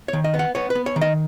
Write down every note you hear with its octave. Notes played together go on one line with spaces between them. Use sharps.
D#3 C#5
D#5
B3
F#5
B3 C#5
B4
B3
C#5
D#3
D#5